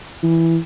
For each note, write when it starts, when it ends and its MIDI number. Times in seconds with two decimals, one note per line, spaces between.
0.23 0.56 52